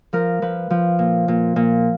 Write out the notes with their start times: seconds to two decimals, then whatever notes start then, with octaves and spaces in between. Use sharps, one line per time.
0.13 F3 A#4
0.42 F3 B4
0.70 F3
0.99 A#2
1.28 A#2
1.56 A#2